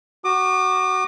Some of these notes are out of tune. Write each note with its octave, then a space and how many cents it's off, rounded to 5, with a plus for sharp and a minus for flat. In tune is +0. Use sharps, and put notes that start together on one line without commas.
F#4 +15 D6 +40